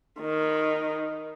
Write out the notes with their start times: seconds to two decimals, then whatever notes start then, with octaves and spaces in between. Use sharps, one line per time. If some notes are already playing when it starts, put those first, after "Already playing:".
0.21 D#3